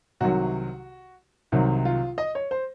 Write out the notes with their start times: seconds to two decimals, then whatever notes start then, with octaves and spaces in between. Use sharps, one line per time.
0.20 C2 C3 D#3 F#3 F#4
1.52 C2 C3 D#3 F#3
1.85 F4
2.18 D#5
2.35 C#5
2.51 C5